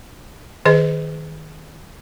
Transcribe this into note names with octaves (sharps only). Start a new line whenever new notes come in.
D#3 G#4 C5 D#5